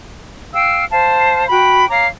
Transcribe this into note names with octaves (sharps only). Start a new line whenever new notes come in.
F5 G5 E6
C5 F5 A5
F#4 G5 B5
C#5 F5 A#5 D6